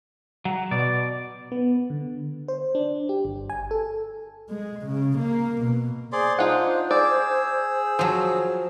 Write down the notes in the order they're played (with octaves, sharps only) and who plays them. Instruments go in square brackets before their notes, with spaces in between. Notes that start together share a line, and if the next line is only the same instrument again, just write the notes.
[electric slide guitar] F#3
[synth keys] B2 [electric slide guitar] D5
[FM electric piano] B3
D3
C5
D4
G4
G1
G#5
A4
[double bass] G#3
C#3
A#3
B2
[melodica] G#4 D5 C6 [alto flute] C5
[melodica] D4 [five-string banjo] D#4 F4 F#5
[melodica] G#4 E6 [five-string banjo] D5
[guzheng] F3 F#3 [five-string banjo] C5